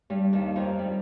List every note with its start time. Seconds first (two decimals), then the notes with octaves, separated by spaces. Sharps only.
0.10 G2 G3
0.33 D#2 D#3
0.56 F2 F3
0.79 G3